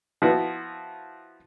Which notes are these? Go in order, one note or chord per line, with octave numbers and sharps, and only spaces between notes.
F3 B3 E4 F#4